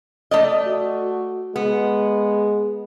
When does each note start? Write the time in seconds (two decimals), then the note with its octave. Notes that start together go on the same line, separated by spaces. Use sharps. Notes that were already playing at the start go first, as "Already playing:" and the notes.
0.31 A3 D5 D#5
0.66 F#4
1.56 G#3 B3